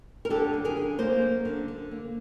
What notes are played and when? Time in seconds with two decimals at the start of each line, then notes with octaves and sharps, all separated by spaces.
0.25 A#4
0.30 D3 G4 A4
0.53 F#2
0.65 G#4 A#4
0.77 D3
0.99 A#3 A#4 C5
1.22 F#2
1.45 D3
1.68 D3
1.91 A#3